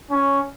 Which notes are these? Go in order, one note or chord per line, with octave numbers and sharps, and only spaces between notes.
C#4